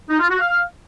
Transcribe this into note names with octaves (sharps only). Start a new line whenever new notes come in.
D#4
F4
F#4
F5